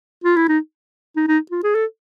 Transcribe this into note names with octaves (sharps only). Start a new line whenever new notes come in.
F4
E4
D#4
D#4
D#4
F4
G#4
A4